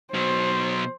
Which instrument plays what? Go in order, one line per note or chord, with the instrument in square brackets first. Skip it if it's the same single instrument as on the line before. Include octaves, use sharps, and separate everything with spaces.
[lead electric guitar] B2 F#3 [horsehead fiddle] C5